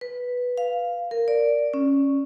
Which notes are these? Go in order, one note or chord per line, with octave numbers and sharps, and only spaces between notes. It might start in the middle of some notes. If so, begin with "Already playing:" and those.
B4
F5
A#4
D5
C#4